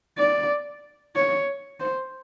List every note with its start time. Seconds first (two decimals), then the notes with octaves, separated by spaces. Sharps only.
0.18 D5
1.16 C#5
1.80 C5